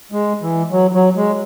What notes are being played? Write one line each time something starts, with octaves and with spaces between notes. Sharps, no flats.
G#3
E3
F#3
F#3
G#3